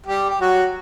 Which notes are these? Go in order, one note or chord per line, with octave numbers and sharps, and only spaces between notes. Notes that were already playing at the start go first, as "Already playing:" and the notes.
G3 G4
G4
F#3 F#4